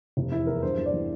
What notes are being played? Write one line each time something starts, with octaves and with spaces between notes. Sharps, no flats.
F1
E2 E4
E2 A#4
G2 C5
E3
D5
E3